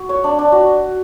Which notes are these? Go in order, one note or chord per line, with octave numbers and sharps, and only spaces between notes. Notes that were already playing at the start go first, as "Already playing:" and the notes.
Already playing: F#4
C#5
D4
D4
F#4